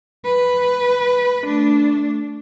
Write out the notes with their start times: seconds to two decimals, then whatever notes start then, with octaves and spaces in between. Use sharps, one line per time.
0.24 B4
1.46 A3 D4